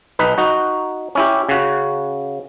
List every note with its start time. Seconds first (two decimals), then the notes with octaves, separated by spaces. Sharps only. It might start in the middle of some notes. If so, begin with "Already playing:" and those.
0.19 B1 D#4 B4
0.38 D#4 F#4
1.15 C#4 E4 G4
1.49 C#3 F#4